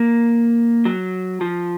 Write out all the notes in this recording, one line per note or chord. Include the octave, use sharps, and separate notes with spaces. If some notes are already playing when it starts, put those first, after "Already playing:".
Already playing: A#3
F#3
F3